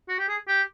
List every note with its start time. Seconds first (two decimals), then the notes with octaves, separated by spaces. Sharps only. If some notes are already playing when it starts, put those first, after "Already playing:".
0.09 F#4
0.19 G4
0.28 G#4
0.48 G4